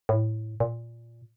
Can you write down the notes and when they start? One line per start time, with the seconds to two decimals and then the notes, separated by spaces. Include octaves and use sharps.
0.09 A2
0.60 A#2